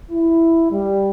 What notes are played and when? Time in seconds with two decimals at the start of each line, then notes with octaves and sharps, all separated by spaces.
0.10 E4
0.71 G3